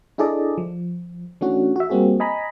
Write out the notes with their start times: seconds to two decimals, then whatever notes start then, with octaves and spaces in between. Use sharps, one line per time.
0.18 D4 E4 G#4 A4 D5 D#5
0.58 F3
1.41 E3 A3 C#4 D4 F#4
1.76 F#4 E5
1.90 G3 A#3 C4 F#4 G#4
2.20 D#5 G#5 A#5 B5